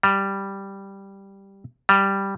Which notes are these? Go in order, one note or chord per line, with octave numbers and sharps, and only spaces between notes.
G3
G3